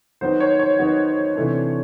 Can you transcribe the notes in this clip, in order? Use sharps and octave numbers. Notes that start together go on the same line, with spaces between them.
D#3 F#3 B3 D#4 F#4 C5
C#5
C#5
D#3 F#3 B3 D#4 F#4
C3 E3 A3 D4